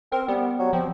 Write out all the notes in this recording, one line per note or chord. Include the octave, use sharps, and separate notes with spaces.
C4 A#4
G3 B3
F#3
F3 C4